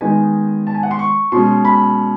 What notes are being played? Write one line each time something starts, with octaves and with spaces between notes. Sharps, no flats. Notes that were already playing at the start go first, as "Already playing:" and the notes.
D#3 G#3 B3 D#4 G#5
A5
G#5
F#5
C6
C#6
B2 G#3 C#4 C6
B5